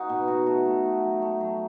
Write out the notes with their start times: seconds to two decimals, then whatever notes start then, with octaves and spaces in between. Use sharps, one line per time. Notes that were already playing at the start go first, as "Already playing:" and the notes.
Already playing: D#4 F#4
0.09 B2
0.28 F#4
0.47 A3
0.66 A3
0.85 A3
1.04 F#3
1.22 A3
1.41 F#3